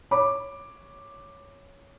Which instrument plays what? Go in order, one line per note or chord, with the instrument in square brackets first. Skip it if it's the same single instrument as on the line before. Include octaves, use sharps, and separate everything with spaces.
[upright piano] C#5 B5 D6